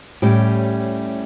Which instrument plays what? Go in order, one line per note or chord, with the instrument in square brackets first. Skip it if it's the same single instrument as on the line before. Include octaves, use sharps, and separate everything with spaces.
[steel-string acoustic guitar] A2 G3 C#4 G4